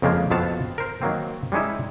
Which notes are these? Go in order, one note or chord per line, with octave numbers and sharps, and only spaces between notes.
F2 C#3 F3 G#3 A#3
F2 B2 B3 C4 F5 A5
A#4 C5
D#3 F#3 A#3 C4
G3 G#3 C#4 D#4 E4